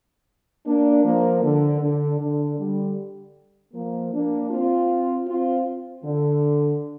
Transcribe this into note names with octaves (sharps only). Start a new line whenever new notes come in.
A#3 D4
F3 A#3
D3
D3
D3
D3 G3
F3 A#3
A#3 D4
C4 F4
C4 F4
D3